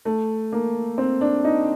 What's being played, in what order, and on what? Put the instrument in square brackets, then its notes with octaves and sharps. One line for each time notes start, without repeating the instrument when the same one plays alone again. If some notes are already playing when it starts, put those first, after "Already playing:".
[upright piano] A3
A#3
C4
D4
D#4